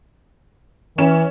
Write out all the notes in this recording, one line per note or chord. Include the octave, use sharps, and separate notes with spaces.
E3 C#4 E7